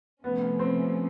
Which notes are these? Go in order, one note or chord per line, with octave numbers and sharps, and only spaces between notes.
C3 F3 A3 B3 C#4
C4